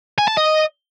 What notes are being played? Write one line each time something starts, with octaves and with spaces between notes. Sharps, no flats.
G#5
A5
D#5